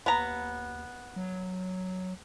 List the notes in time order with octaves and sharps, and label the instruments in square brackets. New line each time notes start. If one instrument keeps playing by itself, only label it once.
[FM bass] D#2 [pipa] B3 A#5
[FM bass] F#3